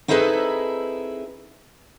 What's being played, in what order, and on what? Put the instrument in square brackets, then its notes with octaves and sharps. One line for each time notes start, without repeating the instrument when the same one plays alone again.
[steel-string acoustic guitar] C4 D#4 E4 G#4 A4 B4